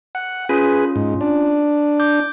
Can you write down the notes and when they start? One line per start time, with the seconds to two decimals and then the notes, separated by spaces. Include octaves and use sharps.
0.15 F#5
0.49 C#4 F4 G#4 B4
0.96 G#2
1.21 D4
2.00 D6 G6